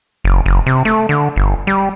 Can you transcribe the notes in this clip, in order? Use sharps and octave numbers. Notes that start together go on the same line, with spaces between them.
F#1
F#1
C3
A3
D3
G1
G3